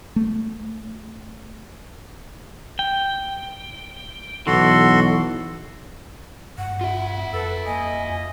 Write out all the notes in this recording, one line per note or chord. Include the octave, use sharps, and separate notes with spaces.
A3
G5
B1 E3 F#4 A4 C6
G2 F#5
F4 E5
F2 A4 B4
A#3 D#5 G#5